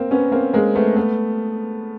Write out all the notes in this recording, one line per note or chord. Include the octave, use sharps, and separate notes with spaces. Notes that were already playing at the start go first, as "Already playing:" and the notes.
Already playing: A#3 C4
B3 C#4
A#3 C4
G#3 A#3
A3 B3
A3 B3